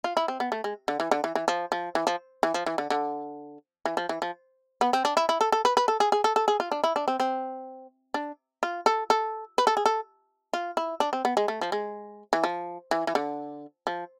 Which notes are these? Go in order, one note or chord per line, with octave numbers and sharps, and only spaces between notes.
F4
E4
C4
B3
A3
G#3
D3
E3
D3
E3
E3
F3
F3
E3
F3
E3
F3
E3
D3
D3
E3
F3
E3
F3
B3
C4
D4
E4
E4
A4
A4
B4
B4
A4
G#4
G#4
A4
A4
G#4
F4
D4
E4
D4
C4
C4
D4
F4
A4
A4
B4
A4
G#4
A4
F4
E4
D4
C4
B3
G#3
A3
F3
G#3
E3
F3
E3
E3
D3
F3